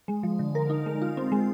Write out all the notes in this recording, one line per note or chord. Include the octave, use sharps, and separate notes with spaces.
G#3
F3
D3
A#4
D#4
G#3
F4
C4
G#3